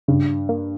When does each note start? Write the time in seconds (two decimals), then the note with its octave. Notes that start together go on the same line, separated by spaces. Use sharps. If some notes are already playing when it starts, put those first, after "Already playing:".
0.08 G2 C#3
0.49 A#3